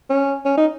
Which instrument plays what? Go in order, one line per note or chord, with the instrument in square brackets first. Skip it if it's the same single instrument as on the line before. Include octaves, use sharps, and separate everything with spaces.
[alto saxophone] C#4
C#4
D#4